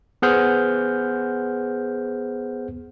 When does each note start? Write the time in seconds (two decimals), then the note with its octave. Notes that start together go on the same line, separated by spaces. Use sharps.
0.22 B3 G#4 C5 F#5 F6 G6